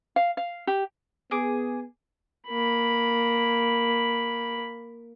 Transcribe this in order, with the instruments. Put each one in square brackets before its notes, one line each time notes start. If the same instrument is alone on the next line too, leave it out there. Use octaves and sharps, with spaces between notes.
[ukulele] F5
F5
G4
[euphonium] B3 [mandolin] G#4 D6
[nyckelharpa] A#3 B5